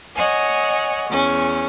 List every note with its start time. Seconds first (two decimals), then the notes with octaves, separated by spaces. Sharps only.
0.15 C#5 D#5 F#5 G#5
1.10 E2 C#4